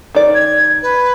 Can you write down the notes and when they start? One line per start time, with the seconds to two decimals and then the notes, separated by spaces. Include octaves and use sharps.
0.15 D#3 D5
0.35 G#6
0.82 B4